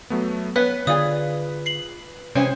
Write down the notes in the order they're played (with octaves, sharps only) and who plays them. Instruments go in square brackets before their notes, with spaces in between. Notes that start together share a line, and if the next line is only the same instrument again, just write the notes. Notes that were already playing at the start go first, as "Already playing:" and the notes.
[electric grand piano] F#3 A3 B3
[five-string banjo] B3 [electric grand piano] B4 [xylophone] C#5 F#6 B6
[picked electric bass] D3 [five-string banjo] F4 G#4 [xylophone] D5 D#6
[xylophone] C7 F#7
[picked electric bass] C3 [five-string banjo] E3 G#3 C#4 [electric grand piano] C5 [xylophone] G5